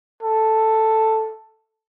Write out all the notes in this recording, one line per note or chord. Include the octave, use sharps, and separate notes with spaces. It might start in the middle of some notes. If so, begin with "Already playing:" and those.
A4